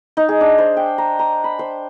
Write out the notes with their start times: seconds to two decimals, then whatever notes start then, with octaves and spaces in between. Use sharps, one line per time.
0.17 D#4
0.29 G#4
0.41 D4
0.58 C5
0.77 G5
0.98 A#5
1.19 A#5
1.44 B5
1.59 C5